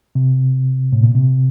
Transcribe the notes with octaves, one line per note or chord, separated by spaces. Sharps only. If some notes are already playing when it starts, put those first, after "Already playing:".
C3
A2
A#2
C3